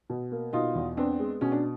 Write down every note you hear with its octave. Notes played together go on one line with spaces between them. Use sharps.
B2
A#3
B2 D#4 F4
E2
B3 C4 D4
G#3
B2 C#4
D4